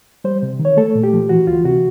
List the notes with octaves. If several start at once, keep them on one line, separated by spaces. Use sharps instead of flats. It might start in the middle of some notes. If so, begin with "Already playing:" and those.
G3 C5
C3
D#3
C#5
A3 A4
A#2
G4
F3
E3 F#4
D2 F4
C3 F#4